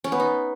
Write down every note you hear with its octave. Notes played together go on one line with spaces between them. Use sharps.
C#4
B3
D#4